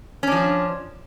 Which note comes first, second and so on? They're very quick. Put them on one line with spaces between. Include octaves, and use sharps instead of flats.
C#4 D4 F3